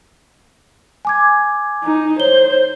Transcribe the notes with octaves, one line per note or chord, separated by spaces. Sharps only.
G#5 D6 G#6
D#4
C5 C#5 G7